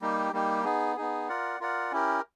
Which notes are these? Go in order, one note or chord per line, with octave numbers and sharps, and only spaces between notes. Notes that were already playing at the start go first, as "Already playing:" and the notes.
G3 A#3 D#4 G4
G3 A#3 D#4 G4
B3 D#4 G#4
B3 D#4 G#4
F4 A#4 D5 F#5
F4 A#4 D5 F#5
C#4 E4 G4 A#4